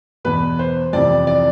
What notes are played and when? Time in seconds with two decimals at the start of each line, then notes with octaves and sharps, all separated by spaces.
0.25 E2 B2 B4
0.59 C5
0.93 F2 C3 E3 D5
1.27 D5